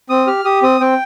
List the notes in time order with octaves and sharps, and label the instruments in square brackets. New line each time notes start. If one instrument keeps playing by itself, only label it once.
[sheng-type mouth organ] C4 D#6
G4 F6
G4 D#6
C4 D#6
C4 G5